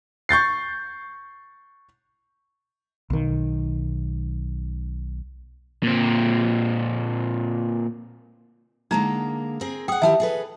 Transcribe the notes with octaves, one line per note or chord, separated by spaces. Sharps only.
C#6 G6 A6 C7
B1 D#3
A#2 C4
D3 G#3 A#3 D#4 E4 A#5
C4 G#4 A#4
G#4 F#5 G5 D#6
D#3 E4 G4 E5 A5
G#4 A4 B4